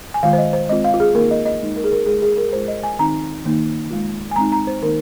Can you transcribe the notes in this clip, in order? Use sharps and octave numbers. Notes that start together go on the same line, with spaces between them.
G#5
D#3 G#3 F4 F5
C5
D#5
C5
G#3 C4 F4 D#5
F5
F4
G#4
D#3 A#3 D#4 A#4
D#5
D#5
G#3 D#4
A#4
G#4
A#4
G#3 F4 G#4
G#4
A#4
G#3 F4 C5
D#5
G#5
D#3 C4 D#4 A#5
D#3 A#3 D#4
G#3 F4
G#5
G#3 C4 D#4 A#5
A#5
C5
D#3 A#3 D#4 A#4